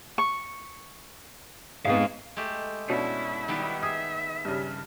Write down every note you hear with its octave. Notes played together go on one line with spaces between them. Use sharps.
C#6
G#2 G#3 B3 C4 F5
G#3 A3 G4
B2 C#4 D4 E4
D#3 G3 B3
G#4 E5 D#6
G2 C#3